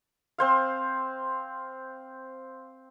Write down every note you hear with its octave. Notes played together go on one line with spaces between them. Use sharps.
C4 C5 F5